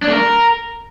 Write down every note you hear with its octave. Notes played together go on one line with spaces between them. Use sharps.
D4
A3
A#4